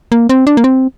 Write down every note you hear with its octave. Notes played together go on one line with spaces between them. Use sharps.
A#3
C4
D4
A#3
C4